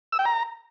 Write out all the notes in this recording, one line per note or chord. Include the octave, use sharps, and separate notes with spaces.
E6
G5
A#5